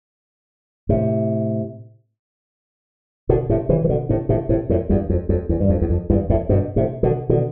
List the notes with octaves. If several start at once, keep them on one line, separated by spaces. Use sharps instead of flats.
A2 C3
B2 D3
A2 C3
C3 E3
E3
B2 D3
A2 C3
A2 C3
A2 C3
F2 A2
E2 G2
F2
F2
E2
G2
F2
E2
F2
E2 G2
F2 A2
G2 B2
A2 C3
B2 D3
B2 D3